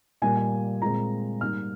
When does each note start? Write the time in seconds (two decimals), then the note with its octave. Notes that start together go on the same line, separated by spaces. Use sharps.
0.22 A#2 G3 A#3 G#5
0.37 G#5
0.82 A#2 G#3 C4 A#5
1.41 G#2 G3 A#3 F6